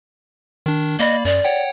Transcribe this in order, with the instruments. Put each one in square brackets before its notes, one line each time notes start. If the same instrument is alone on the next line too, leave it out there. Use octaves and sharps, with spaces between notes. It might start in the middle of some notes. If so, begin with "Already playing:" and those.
[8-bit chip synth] D#3 D4
[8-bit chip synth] A#3 D5 B5 [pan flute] D#5
[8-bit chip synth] F#2 [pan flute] D5
[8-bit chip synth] C#5 F#5 G5